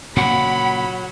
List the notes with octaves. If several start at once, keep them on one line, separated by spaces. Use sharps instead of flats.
A#2 C#3 F#3 A#3 F#5 B5